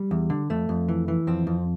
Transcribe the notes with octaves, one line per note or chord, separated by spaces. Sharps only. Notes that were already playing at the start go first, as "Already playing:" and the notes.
Already playing: G3
E2
D3
F2 A3
F2
E3
E3
F2 C4
F2